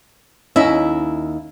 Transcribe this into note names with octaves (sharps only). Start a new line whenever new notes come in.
D#2 C#4 E4 D#5 E5